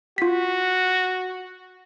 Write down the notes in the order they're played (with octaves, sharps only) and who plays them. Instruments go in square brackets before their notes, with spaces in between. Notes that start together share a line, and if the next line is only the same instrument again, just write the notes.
[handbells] F4 B6 [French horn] F#4